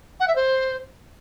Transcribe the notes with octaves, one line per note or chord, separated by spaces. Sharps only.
F#5
E5
C5